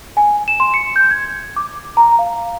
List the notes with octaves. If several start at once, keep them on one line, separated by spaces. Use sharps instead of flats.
G#5
E7
C6
C#7
G6
G#6
D6
A#5
F5